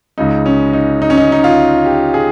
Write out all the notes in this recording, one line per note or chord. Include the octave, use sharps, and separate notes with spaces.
C#2 C#3 G#3 D#4
C#4
D#4
D#4
C#4
D#4
D#4
F4
G4
G#4